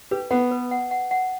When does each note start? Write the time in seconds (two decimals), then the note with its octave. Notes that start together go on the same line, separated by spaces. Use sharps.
0.11 G4 B4
0.31 B3 F#5
0.51 B4
0.71 F#5
0.91 F#5
1.11 F#5